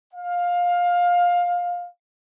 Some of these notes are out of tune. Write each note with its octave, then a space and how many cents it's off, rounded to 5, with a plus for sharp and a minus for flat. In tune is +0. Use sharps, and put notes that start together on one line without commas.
F5 +15